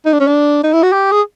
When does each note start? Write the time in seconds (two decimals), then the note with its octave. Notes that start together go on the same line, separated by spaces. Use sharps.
0.06 D#4
0.13 D4
0.20 C#4
0.27 D4
0.64 D#4
0.73 E4
0.83 F#4
0.93 G4
1.12 G#4